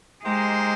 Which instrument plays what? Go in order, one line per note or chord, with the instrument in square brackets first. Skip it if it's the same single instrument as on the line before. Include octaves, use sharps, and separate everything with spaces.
[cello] G#3 [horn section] A#3 D#4 G4 C5